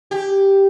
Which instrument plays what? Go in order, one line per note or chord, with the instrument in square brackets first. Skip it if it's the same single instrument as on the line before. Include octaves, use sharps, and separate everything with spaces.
[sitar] G4